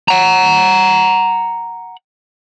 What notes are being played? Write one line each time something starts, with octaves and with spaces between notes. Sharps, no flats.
F#5 A#5